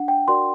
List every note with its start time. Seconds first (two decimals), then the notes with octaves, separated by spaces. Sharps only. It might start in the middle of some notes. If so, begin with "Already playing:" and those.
Already playing: D4 F#5
0.08 G5
0.28 F#4 A#4 D5 C6